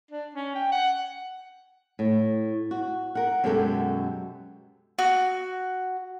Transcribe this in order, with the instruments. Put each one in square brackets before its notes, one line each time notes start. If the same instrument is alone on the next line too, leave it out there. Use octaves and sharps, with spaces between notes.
[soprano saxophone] D4
C#4
G5
F#5
[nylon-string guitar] A2
F#4
A#4 F#5
F#2 B2 G#3 G4 A4 E5
[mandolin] F#4